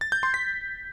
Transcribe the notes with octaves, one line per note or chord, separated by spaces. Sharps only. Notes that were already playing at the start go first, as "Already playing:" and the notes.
A6
G6
C6
B6